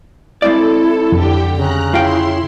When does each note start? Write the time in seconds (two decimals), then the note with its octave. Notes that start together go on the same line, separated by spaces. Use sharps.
0.42 G#3 C4 E4 A4 D5
1.12 F2 D3 G4 G5
1.56 C#3 A#5 F#6
1.94 E4 F4 G5 C6